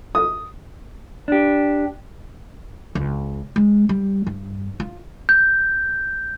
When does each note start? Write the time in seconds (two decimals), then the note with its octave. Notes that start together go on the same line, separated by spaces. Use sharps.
0.15 D#6
1.28 D4 G4
2.95 C#2
3.56 G#3
3.89 G3
4.27 G2
4.80 F4
5.29 G6